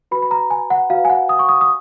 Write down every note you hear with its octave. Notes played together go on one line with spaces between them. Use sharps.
F#4 B4 B5
B5
A#5
G#5
F#5
F#4 B4 F5
G#5
F#5
D#6
C#6
D#6
D#6